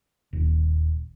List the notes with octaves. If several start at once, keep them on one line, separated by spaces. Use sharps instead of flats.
D#1